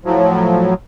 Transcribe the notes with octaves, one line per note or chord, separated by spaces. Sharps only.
A2 F3 F#3